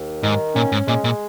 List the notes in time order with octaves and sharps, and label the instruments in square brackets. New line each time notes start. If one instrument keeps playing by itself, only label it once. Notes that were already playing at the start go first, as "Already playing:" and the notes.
Already playing: [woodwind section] D#2
[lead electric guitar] G#2 [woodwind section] D#3
[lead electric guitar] A#2 [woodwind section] C#4
[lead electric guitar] G#2
[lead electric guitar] A#2 [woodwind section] G#3
[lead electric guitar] A#2